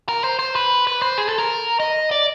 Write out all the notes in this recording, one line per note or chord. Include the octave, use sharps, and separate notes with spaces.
A#4
C5
C5
B4
B4
C5
G#4
A4
A#4
D#5
D5